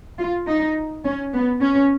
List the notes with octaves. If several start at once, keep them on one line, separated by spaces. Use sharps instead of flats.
F4
D#4
C#4
B3
C#4